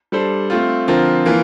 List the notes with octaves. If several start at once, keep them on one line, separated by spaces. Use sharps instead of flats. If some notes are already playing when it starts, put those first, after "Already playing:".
G3 D4 A4 C5
A3 C4 F4
D3 F3 C4 F4 A#4
E3 A#3 F4